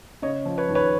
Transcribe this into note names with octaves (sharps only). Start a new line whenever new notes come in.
C#3 C#5 D#5
F3
B4 C#5
D#2
B4 C#5